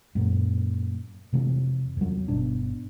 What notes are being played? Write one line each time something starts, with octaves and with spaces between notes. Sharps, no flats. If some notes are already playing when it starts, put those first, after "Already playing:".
F#2 A#2
F2 C3 E3
E2 F#3
G1 B2 D4